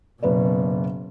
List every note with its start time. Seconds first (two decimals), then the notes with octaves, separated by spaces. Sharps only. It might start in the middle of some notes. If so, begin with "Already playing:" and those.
0.23 F#1 B2 B4 D5